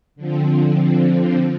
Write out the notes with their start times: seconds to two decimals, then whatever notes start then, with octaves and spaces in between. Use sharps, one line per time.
0.16 D3 F3 C4